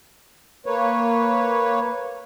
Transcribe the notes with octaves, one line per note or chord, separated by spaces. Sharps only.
A#3 B4 C#5